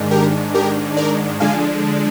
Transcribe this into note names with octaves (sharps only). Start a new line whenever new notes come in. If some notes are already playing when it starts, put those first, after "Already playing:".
Already playing: G#2 D#3 G#3 D4
G4 A#4
G4 A#4
A#4 D5
D3 F3 G#3 D4 F5 G#5